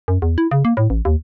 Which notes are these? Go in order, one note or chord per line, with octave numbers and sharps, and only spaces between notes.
F#2
E2
E4
C#3
A#3
A2
A1
D#2